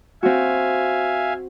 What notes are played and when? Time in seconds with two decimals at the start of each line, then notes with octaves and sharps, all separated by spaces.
0.23 C4 F#4 E5 F5 G#5